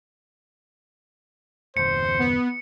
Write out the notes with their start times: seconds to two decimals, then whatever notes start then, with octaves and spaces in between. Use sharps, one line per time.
1.77 G1 E2 C5 C#7
2.19 B3